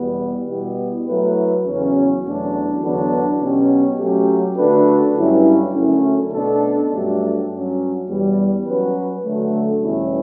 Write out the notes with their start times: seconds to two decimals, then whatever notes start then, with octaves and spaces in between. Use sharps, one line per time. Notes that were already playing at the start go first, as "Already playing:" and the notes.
Already playing: E2 B2 G3 B3
0.48 B2 G3 B3 E4 G4
1.07 F#3 A3 E4 B4
1.65 E2 C#3 F#3 C#4
2.24 E2 B2 F#3 A3 D4
2.82 E2 D3 F#3 B3 D4
3.41 B2 F#3 C#4 G4
3.99 F#3 A3 C#4 G4
4.57 D3 A3 D4 F#4 B4
5.16 G2 F#3 C#4 E4 G4
5.74 F#2 D3 A3 C#4
6.32 B2 A3 D4 A4
6.90 G2 F#3 A3 D4 G4
7.49 G2 F#3 C#4
8.07 E2 B2 G3
8.66 F#3 C#4 F#4 B4
9.24 D3 F#3 A3
9.82 E2 B2 G3 C#4 E4